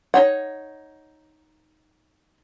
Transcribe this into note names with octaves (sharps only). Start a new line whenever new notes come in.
D#4 C#5 F#5